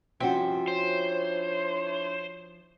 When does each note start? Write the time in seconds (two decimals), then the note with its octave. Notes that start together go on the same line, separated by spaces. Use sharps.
0.20 G2 C3 F3 C#4 F#4 E5 G5 C6
0.68 D4 E4 C5 C#5